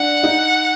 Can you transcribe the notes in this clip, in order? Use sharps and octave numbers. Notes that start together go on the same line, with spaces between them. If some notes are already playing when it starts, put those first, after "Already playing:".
Already playing: D4 F#5
D#4